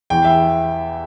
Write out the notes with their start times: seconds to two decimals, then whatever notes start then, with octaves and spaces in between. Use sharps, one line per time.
0.10 E2 E3 G5
0.25 E5